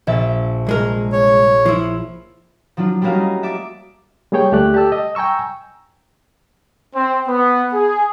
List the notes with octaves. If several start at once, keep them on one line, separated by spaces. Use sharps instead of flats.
A#1 E5 A6
C2 G#3 A#4
C#5
F3 E4
F3 F#3 D4 F4
G3 A3 A#3 C#4 F#4 F5
D#5
E5 A5 D6
G3 A#3 G#4 C#5 G5
D2 D3 A3 G4 D5 F#6
G4 A4 A5 E6
D#5
G5 G#5 A#5 C#6 E6
C4
B3
G#4